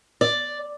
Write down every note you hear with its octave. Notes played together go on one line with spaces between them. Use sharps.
D5